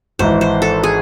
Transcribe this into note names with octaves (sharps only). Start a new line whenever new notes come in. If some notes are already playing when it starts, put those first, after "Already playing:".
G#1 G#2 E3 C5
C5
A4
G#4